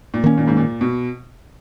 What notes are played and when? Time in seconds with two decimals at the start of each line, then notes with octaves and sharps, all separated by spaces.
0.14 A#2
0.24 D#3 A#3 C#4
0.38 A#2
0.47 G#2
0.57 A#2
0.81 B2